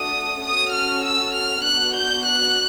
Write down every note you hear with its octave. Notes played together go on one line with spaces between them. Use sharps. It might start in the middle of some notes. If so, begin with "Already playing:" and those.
Already playing: A3 D4 F#4 A4 D#6
C#4 F#4 A4 D#6
F6
E6
F6
B3 D4 F#4 F#6
G6
F#6